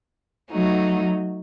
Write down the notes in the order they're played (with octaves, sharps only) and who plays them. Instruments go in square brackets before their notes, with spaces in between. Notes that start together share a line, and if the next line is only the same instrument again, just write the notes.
[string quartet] F#3 A3 D#4 F#4